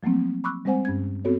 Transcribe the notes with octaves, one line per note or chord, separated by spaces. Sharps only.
F3 F#3 A3 A#3 C4
B5 C#6 D6 E6 F#6
G3 G#3 C4 C5 F#5 G#5
G2 C#4 G#6
B3 C4 F#4 A4 C#5